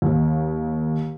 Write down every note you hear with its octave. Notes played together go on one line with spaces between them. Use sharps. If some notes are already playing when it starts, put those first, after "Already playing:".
D#2